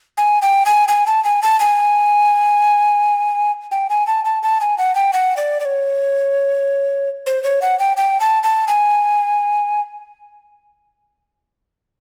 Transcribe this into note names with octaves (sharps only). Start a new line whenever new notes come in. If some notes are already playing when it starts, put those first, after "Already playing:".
G#5
G5
G#5
G#5
A5
G#5
A5
G#5
G5
G#5
A5
A5
A5
G#5
F#5
G5
F#5
D5
D5
C#5
C5
C#5
F#5
G5
G5
A5
A5
G#5